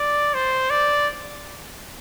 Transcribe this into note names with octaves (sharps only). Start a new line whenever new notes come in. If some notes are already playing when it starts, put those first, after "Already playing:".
Already playing: D5
C5
D5